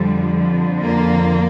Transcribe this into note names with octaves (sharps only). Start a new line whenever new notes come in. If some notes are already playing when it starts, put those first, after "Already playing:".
Already playing: F2 D3 F3 G3
A#3